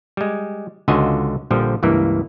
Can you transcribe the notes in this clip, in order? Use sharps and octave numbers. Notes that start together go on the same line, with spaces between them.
G3 G#3
C#2 D3 F4 F#4 D#5 G#5
A#1 D3 F3 G3
C#2 G2 E3 A#3